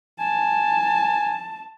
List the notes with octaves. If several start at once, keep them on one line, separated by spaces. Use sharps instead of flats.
G#5 A5